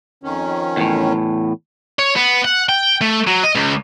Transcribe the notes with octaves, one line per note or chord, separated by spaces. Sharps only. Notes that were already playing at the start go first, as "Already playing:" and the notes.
F2 D#3 C#4
E2 A2
C#5
B3
F#5
G5
A3
F#3
D#5
C#2